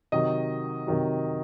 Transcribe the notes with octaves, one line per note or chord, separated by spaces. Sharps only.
C3 D#3 F#3 D#5
C3 D#3 F#3